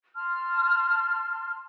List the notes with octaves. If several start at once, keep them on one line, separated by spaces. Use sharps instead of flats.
A5 C6 F6